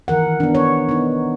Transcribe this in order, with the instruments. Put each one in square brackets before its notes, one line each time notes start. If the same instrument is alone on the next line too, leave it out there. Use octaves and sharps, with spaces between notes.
[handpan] D#3 E3 A#4 F#5
B3 D4
C#5
B3 D#4